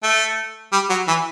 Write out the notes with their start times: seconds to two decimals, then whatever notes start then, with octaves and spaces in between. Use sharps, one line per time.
0.03 A3
0.72 G3
0.90 F#3
1.08 E3